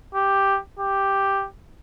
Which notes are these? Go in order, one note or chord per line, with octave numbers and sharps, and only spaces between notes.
G4
G4